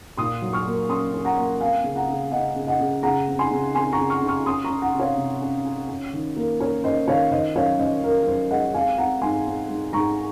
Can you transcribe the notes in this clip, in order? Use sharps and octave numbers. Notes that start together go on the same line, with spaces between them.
A#2 C6 D#6
F#3
C#6 F6
A#3
C#4 C6 D#6
C#4
F#5 A#5
A#3
C4 F5 G#5
C#3
F#5 A#5
C#3
C#3 D#5 F#5
C#3
D#5 F#5
C#3
C#3 F#5 A#5
C4
G#5 C6
C#3
C4 G#5 C6
A#5 C#6
C#3
C#6 F6
C#3
C#6 F6
C#4 C6 D#6
A#5 C#6
C#4
F#5 A#5
C3
C#5 F5
C3
C#4
C#4
C#4
D#3
A#3
C#4 A#4 C#5
C#4 C5 D#5
D#3 C#5 F5
D#3 C5 D#5
F#2 C#5 F5
F#2 C5 D#5
F#2 A#4
A#4
F#2 C5
G#3 D#5 F#5
C4 F5 G#5
C4 F#5 A#5
G#2 G#5 C6
C4
G#2
G#2 A#5 C#6